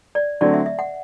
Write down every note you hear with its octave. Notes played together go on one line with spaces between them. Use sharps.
D5
D3 F#3 A3 C4 D5
E5
E5
F#5